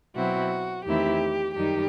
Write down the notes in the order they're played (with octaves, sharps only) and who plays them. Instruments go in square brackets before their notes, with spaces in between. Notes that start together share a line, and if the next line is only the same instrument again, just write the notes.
[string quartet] B2 F#3 C4 E4 F#4
E2 D#3 A3 C4 E4 G4
F#2 D#3 G3 D#4 G4